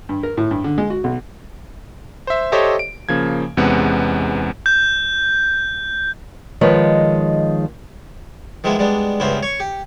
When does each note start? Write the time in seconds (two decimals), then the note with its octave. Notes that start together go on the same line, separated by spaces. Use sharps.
0.09 G2
0.23 A#4
0.37 A2
0.51 G2
0.64 D3
0.78 G#3
0.90 F#4
1.04 B1
2.27 C5 E5
2.52 G4 A4 C5 C#5 D#5 E5
2.79 D7
3.09 C#3 F3 A#3 G#6
3.57 E2 C3 G#3 B3 C#4 F#5
4.66 G6
6.61 D#3 F3 G#3 A#4 B4 C#5
8.64 D#3 F3 G#3 A#3 B3 E4
8.79 G3 G#3 B3 D4
9.20 C#2 G2 B3 C#4 E4 C5
9.43 C#5 C#6
9.60 G4